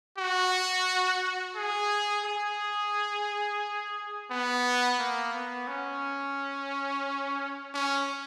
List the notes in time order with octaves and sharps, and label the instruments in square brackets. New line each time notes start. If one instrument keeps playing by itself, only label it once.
[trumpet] F#4
G#4
G#4
B3
A#3
B3
C#4
C#4